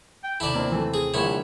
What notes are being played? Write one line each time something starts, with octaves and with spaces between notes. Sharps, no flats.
G5
D#2 C3 E4 A4 D5
A#3 C4 D4
E3 A3
G#4
A#1 D3 G3 E4 F#4 C#5